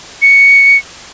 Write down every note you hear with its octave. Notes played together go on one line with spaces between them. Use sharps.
C#7